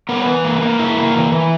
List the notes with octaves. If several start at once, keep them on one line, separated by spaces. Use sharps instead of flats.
B3 A#4
C#5
E3 B4
A#3
A#3
E4
A#3
E3
E3